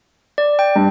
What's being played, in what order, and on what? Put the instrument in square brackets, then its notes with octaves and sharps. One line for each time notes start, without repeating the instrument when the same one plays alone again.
[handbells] D5
G5
[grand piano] G2